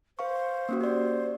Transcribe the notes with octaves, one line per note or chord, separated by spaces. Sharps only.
B4 C5 F5 C#6
A#3 C#4 F#4
G4 C5 D5